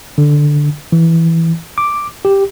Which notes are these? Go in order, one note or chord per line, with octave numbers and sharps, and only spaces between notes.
D3
E3
D6
G4